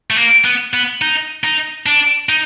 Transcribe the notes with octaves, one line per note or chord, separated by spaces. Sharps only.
A3
A#3
B3
B3
D#4
D#4
D4
D#4